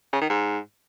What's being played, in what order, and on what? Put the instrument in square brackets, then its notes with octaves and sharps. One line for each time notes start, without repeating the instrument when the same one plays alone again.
[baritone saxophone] C#3
D#3
G#2